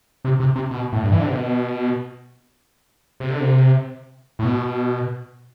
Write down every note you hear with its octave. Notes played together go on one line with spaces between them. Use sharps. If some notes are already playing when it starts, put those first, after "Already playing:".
C3
C3
C3
B2
A2
G2
E3
D3
C3
B2
C3
D3
C3
A2
B2